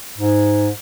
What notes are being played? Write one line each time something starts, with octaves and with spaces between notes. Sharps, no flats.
G#2